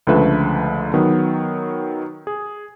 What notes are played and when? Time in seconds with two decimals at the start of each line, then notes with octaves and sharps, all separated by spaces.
0.07 C#2 D3 F3 A3 B4 E5
0.94 D#3 F#3 B3
2.27 G#4